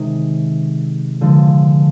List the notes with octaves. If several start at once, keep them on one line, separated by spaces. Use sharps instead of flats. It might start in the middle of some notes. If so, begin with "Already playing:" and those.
Already playing: C3 D#3 G#3 D#5
D3 F3 G#3